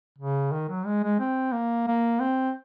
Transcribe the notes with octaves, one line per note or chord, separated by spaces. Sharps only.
C#3
D#3
F#3
G#3
G#3
C4
A#3
A#3
C4